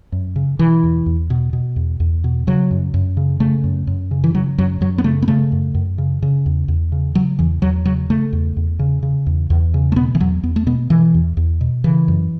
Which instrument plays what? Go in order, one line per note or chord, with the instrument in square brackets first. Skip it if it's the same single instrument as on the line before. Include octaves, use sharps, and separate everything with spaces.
[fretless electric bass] F#2
C#3
B2 E3
E2
E2
B2
B2
E2
E2
B2
C#3 F#3
F#2
F#2
C#3
C#3 A3
F#2
F#2
C#3
E3
C#3 F#3
F#2 F#3
F#2 F#3
B3
C#3 A3
B3
C#3 A3
F#2
F#2
C#3
C#3
E2
E2
C#3
C#3 F#3
E2 E3
E2 F#3
C#3 F#3
C#3 A3
E2
E2
C#3
C#3
E2
E2
C#3
A3
B2 B3
E3
E2 F#3
E2 B3
A3
B2 B3
B2 E3
E2
E2
B2
C#3 E3
F#2